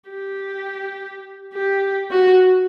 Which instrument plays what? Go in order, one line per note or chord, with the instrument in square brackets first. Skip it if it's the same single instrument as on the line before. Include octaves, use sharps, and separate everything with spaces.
[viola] G4
G4
F#4